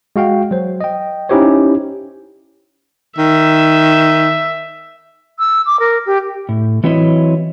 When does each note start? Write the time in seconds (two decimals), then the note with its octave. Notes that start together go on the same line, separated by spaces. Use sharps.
0.16 G#3 F#4 F5 G5
0.51 F#3 C5
0.81 D#5 G5
1.29 C#4 D#4 E4 G4 C5 C#5
3.18 D#3 E5
5.39 E6
5.66 D6
5.80 A#4
6.06 G4
6.49 A2
6.84 E3 F#3 C4 E4 C#5 D#5